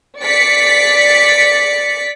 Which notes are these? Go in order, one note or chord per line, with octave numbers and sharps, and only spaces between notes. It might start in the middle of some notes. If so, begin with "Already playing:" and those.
D5 B6 C#7